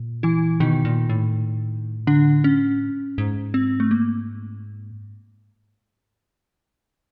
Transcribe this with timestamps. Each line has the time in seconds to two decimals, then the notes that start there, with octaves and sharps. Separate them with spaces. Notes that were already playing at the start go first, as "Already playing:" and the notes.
Already playing: A#2
0.23 E3 E4
0.60 B2 D#3 D#4
0.85 A#2
1.10 A2
2.07 D3 D4
2.44 C#4
3.18 G#2
3.54 C4
3.80 A3
3.91 A#3